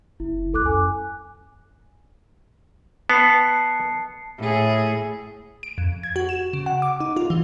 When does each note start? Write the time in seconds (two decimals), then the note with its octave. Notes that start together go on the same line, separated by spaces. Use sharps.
0.20 F#1 E4
0.54 C#2 A4 D6 F#6
0.66 F#2 G#5
3.10 B3 A5 C7 C#7
4.38 A2 G#4
5.63 D7
5.78 F2
6.03 G#6
6.16 F#4
6.29 E7
6.53 C#3
6.66 F#5
6.82 D6
7.00 D#4
7.17 F4
7.30 E3